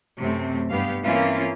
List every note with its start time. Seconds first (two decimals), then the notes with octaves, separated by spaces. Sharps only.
0.18 F#2 C3 A3 C4
0.70 G2 B3 G4 F5
1.04 E3 A#3 C4 C#4 E4 F4